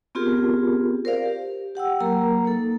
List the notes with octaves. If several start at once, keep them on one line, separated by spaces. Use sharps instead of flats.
B3 C4 F4 G4 G#4 A#4
A#4 C5 D5 F5
G4
G4 F#5 G5 E6
F#3 A#3 A#4 A#5
A#3 D#4 A4